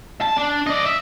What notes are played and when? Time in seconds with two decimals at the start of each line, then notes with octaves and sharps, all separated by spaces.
0.21 A5
0.37 D4
0.66 D5 D#5
0.86 E5